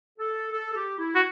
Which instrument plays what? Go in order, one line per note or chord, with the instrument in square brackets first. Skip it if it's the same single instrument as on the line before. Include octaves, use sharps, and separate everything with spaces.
[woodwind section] A4
A4
A4
G4
E4
[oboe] F#4